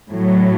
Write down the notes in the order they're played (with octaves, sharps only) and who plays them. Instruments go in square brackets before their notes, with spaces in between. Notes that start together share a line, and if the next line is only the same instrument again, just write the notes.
[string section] A2 F#3